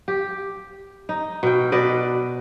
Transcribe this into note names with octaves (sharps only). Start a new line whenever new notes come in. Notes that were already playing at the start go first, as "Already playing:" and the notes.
G4
D#4
B2 G5
B2 B4 D5 D#5